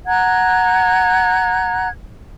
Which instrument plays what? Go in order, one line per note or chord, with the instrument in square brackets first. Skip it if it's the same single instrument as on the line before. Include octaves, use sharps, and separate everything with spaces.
[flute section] F#5 A#5 F#6 G#6